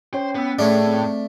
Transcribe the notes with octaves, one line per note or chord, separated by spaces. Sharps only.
C#4 C5 C#5 G5
B3 C#4 E6
A2 A3 D4 G#4 C#5 G#6
C4